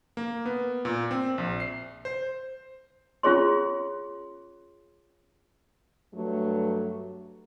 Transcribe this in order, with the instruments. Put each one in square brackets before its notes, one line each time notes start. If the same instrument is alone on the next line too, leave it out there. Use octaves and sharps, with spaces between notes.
[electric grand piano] A#3
B3
A#2
C4
A#1
C7
C5
[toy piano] C#4 F4 G#4 C#5 C6
[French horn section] G2 F#3 A3